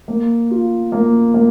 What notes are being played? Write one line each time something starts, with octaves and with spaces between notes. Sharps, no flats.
A#3
F4
A#3
A#3